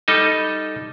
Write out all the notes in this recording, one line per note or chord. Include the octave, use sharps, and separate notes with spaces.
G3 D#4 A4 D#5